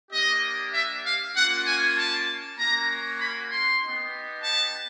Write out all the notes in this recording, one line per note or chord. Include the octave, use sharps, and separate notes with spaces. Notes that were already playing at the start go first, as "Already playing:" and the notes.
A#3 D4 G4 D#5
E5
F5
A#3 C#4 F4 F#5
G#5
A5
A#3 C#4 F#4 A#5
B5
C6
B3 D#4 G4
A5